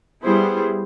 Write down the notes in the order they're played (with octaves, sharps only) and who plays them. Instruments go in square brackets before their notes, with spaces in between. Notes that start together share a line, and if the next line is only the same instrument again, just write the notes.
[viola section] G3 B3 E4 G#4 C5